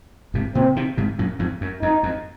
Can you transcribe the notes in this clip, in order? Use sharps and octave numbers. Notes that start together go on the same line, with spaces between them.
G#2 C3
A#2 C#3 C4
C3 D#3
G#2 C3
F#2 A#2
F2 G#2
F#2
F2 D#4
F2